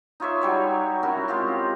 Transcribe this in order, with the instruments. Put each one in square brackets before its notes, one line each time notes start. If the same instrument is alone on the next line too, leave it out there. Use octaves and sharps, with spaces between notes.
[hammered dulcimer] D#4 F4 C#5 E5
F#3 G3 C#5
C#4 E4 F#4 A#4
G#3 C4 F4 G4